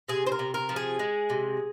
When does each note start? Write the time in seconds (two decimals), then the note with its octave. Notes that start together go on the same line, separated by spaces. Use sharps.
0.08 C3 G#4
0.26 C5
0.32 A#4
0.39 C3
0.54 A#4
0.69 F3
0.76 G#4
0.99 G#3
1.30 C3